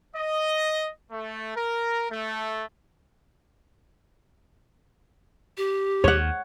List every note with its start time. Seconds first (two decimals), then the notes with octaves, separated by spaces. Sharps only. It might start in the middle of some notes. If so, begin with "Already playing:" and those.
0.15 D#5
1.11 A3
1.55 A#4
2.10 A3
5.57 G4
6.04 D#2 C#5 F#5